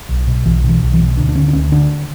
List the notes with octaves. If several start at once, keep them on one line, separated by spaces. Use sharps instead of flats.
B1
B2
B1 E3
B2
E3
B1
E3
B2
D2 D4
D4
D3 C#4
D4
D2 C#4
D3 D4